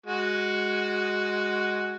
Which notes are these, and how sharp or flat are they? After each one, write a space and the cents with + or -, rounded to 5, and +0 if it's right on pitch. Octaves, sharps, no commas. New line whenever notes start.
G#3 +0 F#4 +0